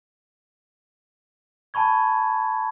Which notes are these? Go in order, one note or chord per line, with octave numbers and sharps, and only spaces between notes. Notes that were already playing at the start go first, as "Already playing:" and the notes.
G#5 A5 B5 C#6 G#6